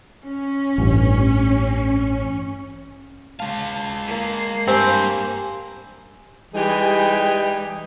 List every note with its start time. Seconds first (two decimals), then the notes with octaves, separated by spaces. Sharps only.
0.24 C#4
0.78 A1 G2
3.40 G#3 F5 A5
4.07 A#3
4.68 G2 C4 G4 G#5
6.54 E3 G3 G#3 D#4 G4 G#4